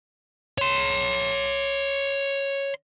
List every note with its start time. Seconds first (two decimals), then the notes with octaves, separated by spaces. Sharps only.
0.58 C#5 C6